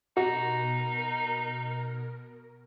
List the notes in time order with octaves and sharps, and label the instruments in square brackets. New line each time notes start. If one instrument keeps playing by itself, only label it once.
[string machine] B2 A#4 [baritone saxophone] D#4 [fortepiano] F#4